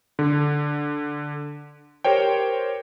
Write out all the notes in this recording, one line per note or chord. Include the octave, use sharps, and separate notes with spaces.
D3
G4 A#4 C5 C#5 G5